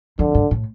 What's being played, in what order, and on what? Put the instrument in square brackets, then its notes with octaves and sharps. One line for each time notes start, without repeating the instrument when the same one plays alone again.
[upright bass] F2 [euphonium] D3
[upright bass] G2
A2